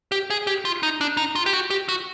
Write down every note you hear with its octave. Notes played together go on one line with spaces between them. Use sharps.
G4
G#4
G4
F4
D#4
D4
D#4
F4
G4
F#4
G4
F#4